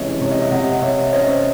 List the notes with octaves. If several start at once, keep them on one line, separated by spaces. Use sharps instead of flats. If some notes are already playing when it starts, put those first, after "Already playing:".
Already playing: C3 E3 G#3 C#4 C#5 D#5 E5
C3 C#5
D#5
E5
C3 D#5 F#5
C3 C#5 E5
C#4 C5 D#5